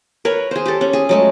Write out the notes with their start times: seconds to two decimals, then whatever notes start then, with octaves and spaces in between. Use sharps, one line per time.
0.25 A#4 B4 C#5
0.51 G#4 C5
0.66 G4 A4
0.81 C#4
0.93 G#4
1.09 F#3 G#3 A3